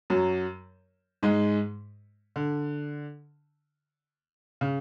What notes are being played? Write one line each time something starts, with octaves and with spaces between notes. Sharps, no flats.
F#2 F#3
G#2 G#3
D3
C#3